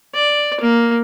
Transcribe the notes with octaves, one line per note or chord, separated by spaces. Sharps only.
D5
A#3